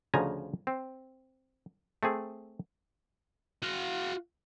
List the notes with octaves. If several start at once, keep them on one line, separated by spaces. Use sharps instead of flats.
D2 C#3 F3 G#5 A#5
C4
A3 C4 G#4
F#4 F5